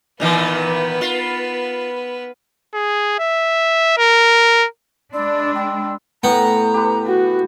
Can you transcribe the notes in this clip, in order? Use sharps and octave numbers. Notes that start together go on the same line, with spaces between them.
A#2 D#3 E3 B3 B4
F4
G#4
E5
A#4
G#3 D4 D5 B5 C6 E6
G5
A2 B3 G5 A#5
G4 B4
F#4